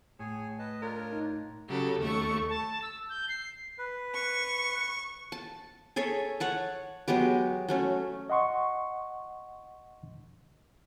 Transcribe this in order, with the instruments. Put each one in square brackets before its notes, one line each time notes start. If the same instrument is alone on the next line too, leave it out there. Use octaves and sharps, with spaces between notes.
[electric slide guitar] A2 [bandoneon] G#4 C#5 G#5
[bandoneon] B4 D#5 A5
[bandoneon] D4 F4 C#5 [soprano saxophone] A#4
[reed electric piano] D#4
[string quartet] C#3 F#3 G4 A4
D#2 A3 A4 C#6
[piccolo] A5
E6
G6
C7
[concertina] B4
[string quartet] C#6
[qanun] A5
G#4 A4 C#5 E5
C#5 F#5 A5
F#3 G#3 B3 G4
F#3 A3 C#4
[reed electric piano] D#5 F#5 C6 C#6